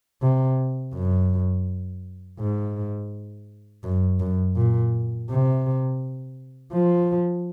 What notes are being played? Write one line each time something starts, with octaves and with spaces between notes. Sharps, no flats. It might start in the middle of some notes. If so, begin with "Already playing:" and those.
C3
F#2
G#2
F#2
F#2
A#2
C3
F3